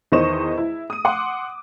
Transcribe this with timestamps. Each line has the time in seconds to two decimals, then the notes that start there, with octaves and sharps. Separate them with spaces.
0.12 E2 D#3 C5 D#5 C#6 E7
0.58 E4
0.90 D#6 D#7
1.05 F#5 C6 D6